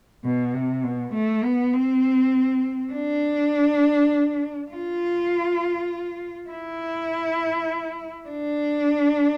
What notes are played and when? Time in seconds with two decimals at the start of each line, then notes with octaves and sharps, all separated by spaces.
0.24 B2
0.54 C3
0.84 B2
1.14 A3
1.44 B3
1.74 C4
2.93 D4
4.71 F4
6.50 E4
8.29 D4